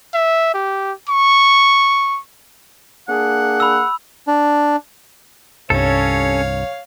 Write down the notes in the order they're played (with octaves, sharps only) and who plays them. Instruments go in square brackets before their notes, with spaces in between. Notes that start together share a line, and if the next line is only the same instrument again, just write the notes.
[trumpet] E5
G4
C#6
[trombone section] A#3 D4 G#4 [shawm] F#5
[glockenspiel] B5 E6
[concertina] D4
[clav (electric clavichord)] C2 G2 [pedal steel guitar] C#4 A4 [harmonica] C#5 F5